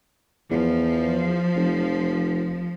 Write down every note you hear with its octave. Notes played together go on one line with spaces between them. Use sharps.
E2 F3
F1